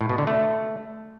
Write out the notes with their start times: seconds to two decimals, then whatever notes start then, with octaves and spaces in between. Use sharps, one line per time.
0.01 A2
0.09 B2
0.18 D3
0.27 A3